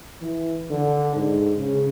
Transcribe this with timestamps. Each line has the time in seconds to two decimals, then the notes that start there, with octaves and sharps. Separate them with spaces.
0.22 E3
0.71 D3
1.16 G#2
1.58 C#3